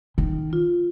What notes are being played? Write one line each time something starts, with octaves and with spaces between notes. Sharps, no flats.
D#3
F4